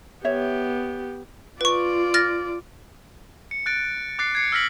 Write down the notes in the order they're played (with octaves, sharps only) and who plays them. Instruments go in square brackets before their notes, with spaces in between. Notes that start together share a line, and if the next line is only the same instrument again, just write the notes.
[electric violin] B3 G4 [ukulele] C#5 E5
[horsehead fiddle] F4 D5 [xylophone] B4 C#6
[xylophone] F6 A6 A#6
[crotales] C#7
F#6 A6 D7
D6 F#6 A6 C7
G#6 C7 C#7
E6 F6 A#6 B6 F#7